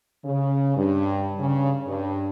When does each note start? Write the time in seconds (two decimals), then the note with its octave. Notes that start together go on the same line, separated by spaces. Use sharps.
0.25 C#3
0.77 G2
1.39 C#3
1.88 G2